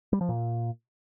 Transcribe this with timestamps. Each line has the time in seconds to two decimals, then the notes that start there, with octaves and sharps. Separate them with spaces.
0.13 G3
0.21 F3
0.29 A#2